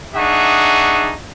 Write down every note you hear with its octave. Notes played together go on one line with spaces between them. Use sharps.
D4 D#4 G#4 E5 F#5 C#6